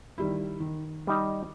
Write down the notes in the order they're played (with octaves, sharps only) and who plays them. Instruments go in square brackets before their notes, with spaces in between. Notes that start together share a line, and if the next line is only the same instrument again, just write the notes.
[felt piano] D#3 G3 E4
D#3
[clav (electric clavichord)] G3 D#4